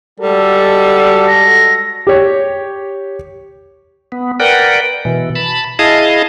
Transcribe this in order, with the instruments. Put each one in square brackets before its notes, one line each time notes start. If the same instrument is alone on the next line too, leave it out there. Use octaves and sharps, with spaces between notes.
[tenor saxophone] G3 [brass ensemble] G#3 F#4 A4
[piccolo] A#6
[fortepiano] G4 C#5
[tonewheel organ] B3
A#4 B4 D5 F#5 G5
B2 E3
A5 B5
E4 G#4 D#5 F5 A5 D#6